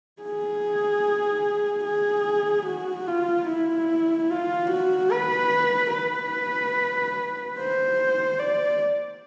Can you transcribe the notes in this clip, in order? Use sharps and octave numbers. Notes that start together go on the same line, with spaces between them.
G#4
G#4
F#4
F4
E4
F4
F#4
B4
B4
C5
D5